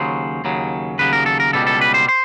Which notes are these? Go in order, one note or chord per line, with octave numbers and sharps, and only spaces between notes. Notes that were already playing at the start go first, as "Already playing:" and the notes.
Already playing: D#2 C#3 F#3 C5
D#2 C#3 F#3
D#2 C#3 F#3 B4
A#4
A4
A#4
C#2 B2 G3 A4
A4
B4
C5
C5